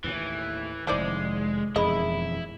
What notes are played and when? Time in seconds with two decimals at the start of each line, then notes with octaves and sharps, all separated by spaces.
0.04 D#2 A2 E3
0.87 F1 D#3 G#3 E4 C5 D5
1.76 E1 F2 D#3 E4 G#4 D#5 E5 B5